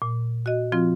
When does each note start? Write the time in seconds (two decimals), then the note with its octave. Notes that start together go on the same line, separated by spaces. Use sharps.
0.02 A#2
0.46 F#4 D#5
0.72 F3 C4 F4